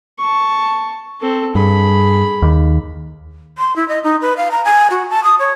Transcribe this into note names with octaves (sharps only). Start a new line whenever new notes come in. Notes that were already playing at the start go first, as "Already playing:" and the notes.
A5 C#6
C4 A4
G2 G#4 B5
D#2
C6
E4
D#5
D#4
B4
F5
A#5
G#5
F#4
A5
D#6
C#5